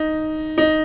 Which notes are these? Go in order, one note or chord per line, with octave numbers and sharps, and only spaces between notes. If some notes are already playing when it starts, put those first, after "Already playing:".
Already playing: D#4
D#4